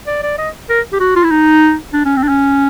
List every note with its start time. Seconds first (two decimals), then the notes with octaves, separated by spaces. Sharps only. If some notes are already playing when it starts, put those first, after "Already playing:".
0.07 D5
0.23 D5
0.38 D#5
0.69 A#4
0.92 G4
1.00 F#4
1.16 F4
1.24 E4
1.31 D#4
1.93 D4
2.05 C#4
2.17 C4
2.23 D4
2.29 C#4